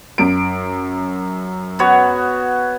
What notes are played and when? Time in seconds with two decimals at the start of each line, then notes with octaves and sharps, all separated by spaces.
0.18 F#2 D7
1.79 B3 F#4 C#5